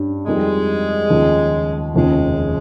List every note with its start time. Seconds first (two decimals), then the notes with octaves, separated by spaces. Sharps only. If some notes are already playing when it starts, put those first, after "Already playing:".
Already playing: G2 G3 C#4
0.26 F2 D#3 G3 G#3
1.10 D#2 C#3 F3
1.94 F1 D#2 C#3 F3 G#3